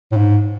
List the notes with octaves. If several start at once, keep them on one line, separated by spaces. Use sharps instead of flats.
A2
G#2